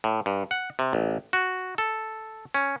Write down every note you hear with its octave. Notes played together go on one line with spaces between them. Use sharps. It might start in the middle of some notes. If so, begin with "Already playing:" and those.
A2
G2
F#5
C3
A1
F#4
A4
C#4